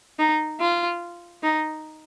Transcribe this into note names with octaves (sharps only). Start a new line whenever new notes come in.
D#4
F4
D#4